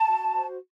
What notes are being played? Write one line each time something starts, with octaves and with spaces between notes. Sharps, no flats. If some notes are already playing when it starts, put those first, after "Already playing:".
Already playing: A5
F#4
C5